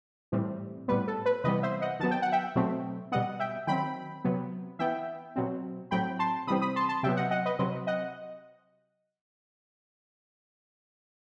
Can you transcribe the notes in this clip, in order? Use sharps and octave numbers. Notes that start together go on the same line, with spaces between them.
A2 E3 G3 C4
A2 G3 B3 B4
A4
B4
C3 E3 G3 B3 B4 D#5
C5 E5
D#5 F#5
D#3 F#3 B3 A5
G5
F#5
E5 G5
B2 F#3 A3 C4
B2 G3 B3 D#5 F#5
E5 G5
D#3 F#3 C4 G5 B5
C3 F#3 B3
E3 B3 E5 G5
B2 F#3 C4
A2 F#3 C4 G5 B5
A5 C6
C3 E3 G3 C4 B5 D#6
B5 D#6
A5 C6
A5 C6
C3 F#3 B3 E5 G5
D#5 F#5
D#5 F#5
B4 D#5
C3 F#3 C4 B4 D#5
D#5 F#5